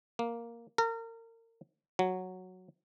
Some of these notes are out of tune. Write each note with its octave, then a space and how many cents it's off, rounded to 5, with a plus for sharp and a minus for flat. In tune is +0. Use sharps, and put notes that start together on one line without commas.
A#3 +0
A#4 -35
F#3 -5